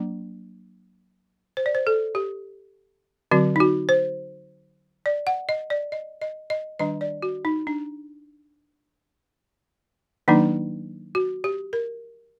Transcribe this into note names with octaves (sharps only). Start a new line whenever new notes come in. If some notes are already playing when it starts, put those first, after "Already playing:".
Already playing: F#3 A#3 D4
C5
D5
C5
A4
G4
D3 F#3 C4 F#4
D#4
F#4
C5
D5
F#5
D#5
D5
D#5
D#5
D#5
D#3 G3 D4 D#5
D5
F#4
D#4
D4
D#3 F#3 A#3 D4 D#4
F#4
G4
A#4